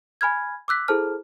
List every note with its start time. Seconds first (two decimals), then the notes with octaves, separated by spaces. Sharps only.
0.21 G#5 B5 F6 G#6
0.68 D6 E6 F#6 B6
0.88 E4 G#4 A4 C5 A5 F6